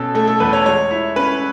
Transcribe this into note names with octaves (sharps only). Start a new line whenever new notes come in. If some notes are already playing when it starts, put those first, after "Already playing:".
Already playing: B2 C#4 A4
A3 A4
A4
E2 B4
C#5
G#3 C#5
E4
C#4 B4